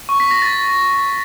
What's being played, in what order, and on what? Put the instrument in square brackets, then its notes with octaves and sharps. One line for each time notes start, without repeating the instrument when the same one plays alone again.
[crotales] C#6
B6
A#6
A6